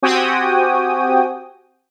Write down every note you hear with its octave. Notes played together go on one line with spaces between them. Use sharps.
C4 F#4 G4 G5 G#5 D#6